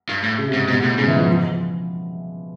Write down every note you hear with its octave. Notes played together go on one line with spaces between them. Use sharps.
G2
A2
C#3
C3
G#2
G#2 B2
A2
G#2 C#3
E3
F3
F3